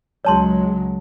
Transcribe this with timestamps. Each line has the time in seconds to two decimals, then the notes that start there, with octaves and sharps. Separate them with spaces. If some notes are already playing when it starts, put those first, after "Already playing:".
0.25 C#2 F#3 G#3 C#5 A5 C6